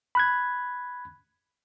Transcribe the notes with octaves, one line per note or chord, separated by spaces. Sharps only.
B5 F#6 G#6